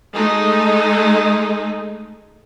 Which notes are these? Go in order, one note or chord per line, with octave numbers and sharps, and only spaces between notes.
G#3 A3 D#4